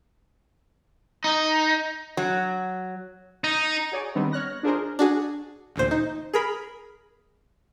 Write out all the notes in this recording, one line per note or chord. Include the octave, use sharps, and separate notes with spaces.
D#4
F#3
D#4
F#4 G#4 C#5 D5
D#3 G3 B3 C4 D4 D#4
C#5 F6 F#6 A#6
D4 F4 G#4 A#4 C5 D#5
D4 F#4 G#4
A1 D2 A#2 C5
D#4
G#4 A#4 B5